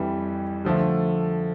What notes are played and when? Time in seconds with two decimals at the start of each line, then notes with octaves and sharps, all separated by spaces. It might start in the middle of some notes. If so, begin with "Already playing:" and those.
Already playing: F2 E3 G3
0.65 D3 F3 A3